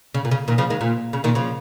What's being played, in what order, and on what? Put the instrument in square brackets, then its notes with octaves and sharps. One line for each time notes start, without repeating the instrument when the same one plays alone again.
[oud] C#3
A#2
C#3
A#2 D#3
C#3 F3
D#3 G#3
A#2
C#3
A#2 D#3
C#3 F3